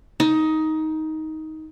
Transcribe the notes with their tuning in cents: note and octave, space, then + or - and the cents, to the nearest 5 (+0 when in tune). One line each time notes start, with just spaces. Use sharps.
D#4 +15